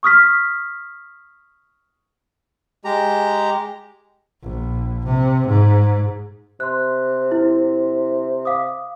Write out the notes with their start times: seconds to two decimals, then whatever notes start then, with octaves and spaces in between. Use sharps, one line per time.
0.03 C#6 D#6 F6 B6
2.85 G#3 G4 A#5
4.42 A#1
5.06 C3
5.47 G#2
6.60 C3 C6 F#6
7.31 E4
8.45 F5 D6 D#6